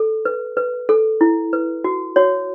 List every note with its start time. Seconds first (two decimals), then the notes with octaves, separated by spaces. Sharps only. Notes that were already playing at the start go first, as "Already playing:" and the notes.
Already playing: A4
0.25 B4
0.57 B4
0.89 A4
1.21 E4
1.53 B4
1.84 F#4
2.16 F#4 C#5